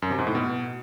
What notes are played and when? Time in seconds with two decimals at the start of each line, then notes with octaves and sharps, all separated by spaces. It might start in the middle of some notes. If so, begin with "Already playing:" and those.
0.02 F#2
0.10 C3
0.19 G#2
0.27 A2
0.35 B2